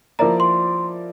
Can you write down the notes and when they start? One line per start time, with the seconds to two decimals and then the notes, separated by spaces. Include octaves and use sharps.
0.19 F3 A#3 E4 A#4 D5 A#5
0.40 C6